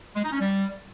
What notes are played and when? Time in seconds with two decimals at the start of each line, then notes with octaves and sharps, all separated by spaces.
0.15 G#3
0.23 D#4
0.32 C#4
0.40 G3